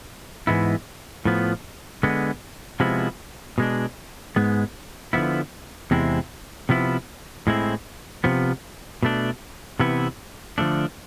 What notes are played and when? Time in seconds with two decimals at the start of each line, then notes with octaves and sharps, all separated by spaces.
0.47 G#2 E3 G#3 B3 E4
1.25 A2 F3 B3
2.03 D3 G#3 B3
2.80 C3 F3 G#3 B3 E4
3.58 B2 G#3 D4
4.36 G#2 G#3 B3
5.13 D3 F3 B3 E4
5.91 E2 C3 G#3 C4 E4
6.69 C3 F3 B3 E4
7.47 A2 G#3 C4 E4
8.24 C3 F3 B3
9.03 B2 A3 D4
9.80 C3 E3 B3 E4
10.58 D3 F3 A3 D4